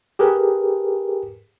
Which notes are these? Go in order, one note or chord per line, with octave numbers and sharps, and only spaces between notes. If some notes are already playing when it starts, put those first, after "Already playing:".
G4 G#4 A#4 B4